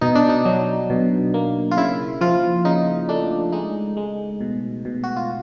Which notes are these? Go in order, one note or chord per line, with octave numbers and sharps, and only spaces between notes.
B2 D#4
D4
D#4
F#3
B2
A#3
F4
C#3 E4
F3 F4
C#3 D#4
A3 D4
G#3 D#4
G#3
B2
B2
F#4
F4